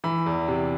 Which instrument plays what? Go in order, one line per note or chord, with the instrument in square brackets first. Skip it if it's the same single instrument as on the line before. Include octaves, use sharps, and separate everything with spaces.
[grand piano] E3 B5
E2
C3